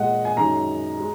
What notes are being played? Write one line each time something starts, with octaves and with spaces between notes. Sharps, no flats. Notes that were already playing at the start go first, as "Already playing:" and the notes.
Already playing: A#2 G#3 D#5 F#5
G#5
F#2 D#3 G#3 A#5
G#3